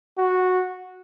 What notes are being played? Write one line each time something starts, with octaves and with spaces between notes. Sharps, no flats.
F#4